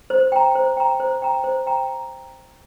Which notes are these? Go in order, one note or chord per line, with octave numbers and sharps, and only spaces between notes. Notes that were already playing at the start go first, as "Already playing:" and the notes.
C5
G5 A#5
C5
G5 A#5
C5
G5 A#5
C5
G5 A#5